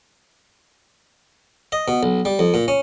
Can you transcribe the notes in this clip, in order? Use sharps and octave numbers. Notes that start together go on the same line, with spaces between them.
D#5
B2
B1
G3
F2
A#2
C#4